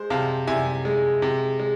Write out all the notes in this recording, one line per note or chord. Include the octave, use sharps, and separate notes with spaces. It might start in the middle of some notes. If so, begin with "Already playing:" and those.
Already playing: G#3 C5
C3 F5 A5
C3 E5 G#5
G#3
C3
G#3